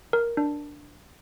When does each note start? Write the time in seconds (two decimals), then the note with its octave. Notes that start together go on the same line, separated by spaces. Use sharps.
0.13 A#4
0.37 D4